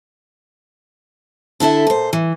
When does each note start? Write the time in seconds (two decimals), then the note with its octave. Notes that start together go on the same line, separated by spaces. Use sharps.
1.60 D3 E4 A4 E5
1.87 A#2 C5
2.13 E3